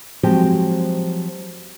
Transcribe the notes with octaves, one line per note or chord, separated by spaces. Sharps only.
F3 F#3 G#3 C4 F#4 G4